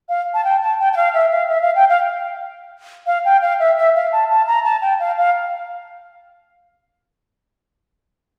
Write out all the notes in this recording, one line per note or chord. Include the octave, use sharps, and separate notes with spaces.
F5
A5
G5
A5
G5
G5
F5
E5
F5
E5
F5
G5
F5
F5
G5
F5
E5
E5
F5
A5
A5
A#5
A5
G5
F5
F5